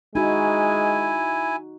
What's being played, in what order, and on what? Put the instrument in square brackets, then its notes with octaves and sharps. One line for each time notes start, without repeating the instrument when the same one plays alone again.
[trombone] G#3 [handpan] D#4 F#4 [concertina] E4 G#5